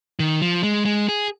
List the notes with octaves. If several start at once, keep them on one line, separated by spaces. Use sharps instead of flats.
D#3
F3
G#3
G#3
G#4